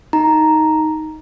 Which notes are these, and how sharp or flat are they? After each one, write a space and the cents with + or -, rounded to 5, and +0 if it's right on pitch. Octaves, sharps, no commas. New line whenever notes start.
D#4 +10 A#5 +0